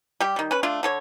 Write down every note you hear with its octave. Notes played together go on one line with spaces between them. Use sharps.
G3 G4
D#3 G3
C#4 B4
A3 D4 F4
D3 A4 C#5